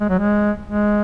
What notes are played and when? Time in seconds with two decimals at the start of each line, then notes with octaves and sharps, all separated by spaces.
0.01 G#3
0.09 F#3
0.19 G#3
0.66 G#3